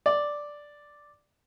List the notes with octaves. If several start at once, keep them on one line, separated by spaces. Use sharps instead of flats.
D5